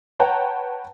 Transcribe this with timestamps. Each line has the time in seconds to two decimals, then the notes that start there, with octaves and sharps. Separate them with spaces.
0.19 B4 C#5 F#5 G5 A5 A#5